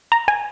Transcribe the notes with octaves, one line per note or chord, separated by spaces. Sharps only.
A#5
G#5